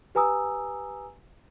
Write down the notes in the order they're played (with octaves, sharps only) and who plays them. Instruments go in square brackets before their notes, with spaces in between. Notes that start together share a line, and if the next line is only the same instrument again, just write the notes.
[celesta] G4 B4 G#5 A#5 D#6 E6